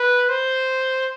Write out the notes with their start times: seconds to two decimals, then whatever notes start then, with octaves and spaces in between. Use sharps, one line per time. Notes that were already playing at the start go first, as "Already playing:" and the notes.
Already playing: B4
0.29 C5